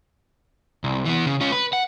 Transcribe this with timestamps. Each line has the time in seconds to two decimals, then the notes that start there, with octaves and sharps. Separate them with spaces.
0.84 C2
1.05 E3 B3
1.26 C#3
1.41 C#4 F4
1.52 B4
1.73 F#5